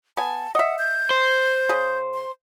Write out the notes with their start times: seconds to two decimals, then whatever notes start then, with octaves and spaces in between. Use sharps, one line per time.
0.17 B3 G#5 A5
0.55 D#5 E5 F#5
0.79 G6
1.10 C5
1.69 C#3 G#4
2.14 C6